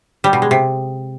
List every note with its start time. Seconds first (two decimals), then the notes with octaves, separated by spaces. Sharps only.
0.24 G3
0.33 B2
0.42 G#3
0.51 C3